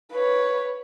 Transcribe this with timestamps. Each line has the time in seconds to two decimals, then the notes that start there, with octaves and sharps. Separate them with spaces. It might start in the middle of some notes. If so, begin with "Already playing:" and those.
0.12 B4 C#5